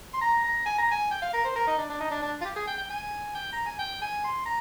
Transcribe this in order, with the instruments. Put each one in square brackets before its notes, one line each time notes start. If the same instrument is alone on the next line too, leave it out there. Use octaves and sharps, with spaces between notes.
[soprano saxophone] C6
A#5
A#5
G#5
A#5
G#5
G5
F5
A#4
C5
A#4
D#4
D4
D4
D#4
D4
D4
F4
G4
G#4
G5
G5
G#5
G5
A#5
G#5
G5
G#5
C6
A#5